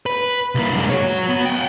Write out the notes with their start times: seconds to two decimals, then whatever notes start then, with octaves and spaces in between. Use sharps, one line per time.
0.06 B4
0.55 C2 A#3
0.75 F#2 G#3
0.90 F#4 C#5
1.29 B3
1.45 F#5 G5